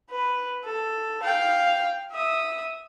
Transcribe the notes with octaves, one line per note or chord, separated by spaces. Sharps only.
B4
A4
F5 G5
E5 D#6